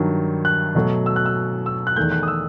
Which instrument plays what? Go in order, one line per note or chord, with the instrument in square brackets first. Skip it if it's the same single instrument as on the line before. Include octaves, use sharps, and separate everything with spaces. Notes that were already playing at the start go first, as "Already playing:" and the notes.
Already playing: [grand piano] G2 D#3 F#3
F#6
B2 F#3 A3
E6
F#6
E6
E6
F#6
E2 D#3 A3 G6
F#6
D#6
E6